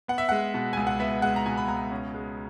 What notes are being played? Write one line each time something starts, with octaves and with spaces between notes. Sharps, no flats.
B3 F#5
E5
G#3 F#5
B2
C#2 G#5
F#5
B3 E5
G#3 F#5
A#5
B2 G#5
B5
C#2 A#5
C#4
G#3